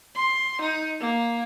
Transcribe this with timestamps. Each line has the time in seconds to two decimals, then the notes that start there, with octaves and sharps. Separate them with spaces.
0.15 C6
0.61 D#4
1.00 A#3